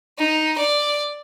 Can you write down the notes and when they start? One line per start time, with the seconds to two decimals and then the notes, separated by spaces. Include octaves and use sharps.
0.18 D#4
0.58 D5